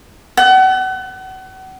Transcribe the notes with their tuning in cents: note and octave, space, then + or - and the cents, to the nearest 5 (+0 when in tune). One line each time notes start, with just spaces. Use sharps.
F#5 +35